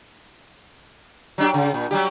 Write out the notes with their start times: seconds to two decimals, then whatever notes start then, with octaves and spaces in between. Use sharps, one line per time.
1.38 F#3 D4 G4
1.54 C#3
1.74 A#2
1.91 F#3 G3 G4